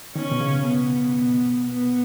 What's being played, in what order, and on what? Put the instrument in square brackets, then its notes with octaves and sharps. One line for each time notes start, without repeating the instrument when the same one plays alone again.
[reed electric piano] D#3 [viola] C#4
[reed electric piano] B2
C#3
[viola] B3
[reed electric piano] B2
[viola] B3